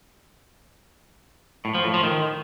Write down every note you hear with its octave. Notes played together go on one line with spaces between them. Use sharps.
A2
F3
A2
F3
D#3